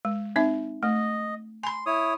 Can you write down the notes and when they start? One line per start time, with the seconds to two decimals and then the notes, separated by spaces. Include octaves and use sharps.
0.05 G#3
0.36 C4 D#4 E5
0.83 A3 D#5
1.63 G#5 B5 C6
1.86 E4 C#5 D#6